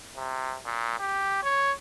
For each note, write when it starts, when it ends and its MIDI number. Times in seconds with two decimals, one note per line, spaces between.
0.16 0.56 48
0.65 0.98 46
1.00 1.39 67
1.44 1.72 73